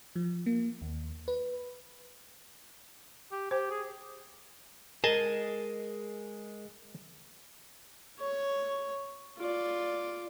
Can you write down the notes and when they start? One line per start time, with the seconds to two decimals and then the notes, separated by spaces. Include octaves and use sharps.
0.16 F3
0.46 A#3
0.82 D#2
1.28 B4
3.32 G4
3.51 G4 C5
3.70 G#4
5.04 G#3 G#4 A#4 D#5 G#5 A5
8.19 C#5
9.38 F4 D5